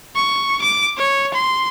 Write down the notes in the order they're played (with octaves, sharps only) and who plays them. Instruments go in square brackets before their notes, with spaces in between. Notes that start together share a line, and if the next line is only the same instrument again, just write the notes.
[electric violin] C#6
D6
C#5
C6